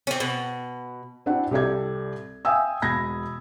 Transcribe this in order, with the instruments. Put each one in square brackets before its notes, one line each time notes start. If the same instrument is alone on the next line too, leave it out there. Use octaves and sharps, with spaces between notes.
[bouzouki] C4 C#4
B2
[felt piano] C4 D4 E4 F#4 F#5
C2 G4 A4 D5 G#6
E5 F5 G5 G#5 D#6 E6
E1 B5 G#6 A#6